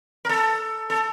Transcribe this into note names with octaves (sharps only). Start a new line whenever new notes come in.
A#4
A4
A4